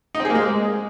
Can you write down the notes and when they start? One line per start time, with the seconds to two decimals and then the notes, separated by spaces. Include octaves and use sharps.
0.15 D#4
0.20 C4
0.25 G#4
0.30 A#3
0.35 G#3